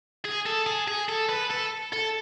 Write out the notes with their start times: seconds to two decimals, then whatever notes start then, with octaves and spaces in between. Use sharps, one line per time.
0.24 G#4
0.46 A4
0.66 G#4
0.88 G#4
1.08 A4
1.29 B4
1.50 A4
1.92 A4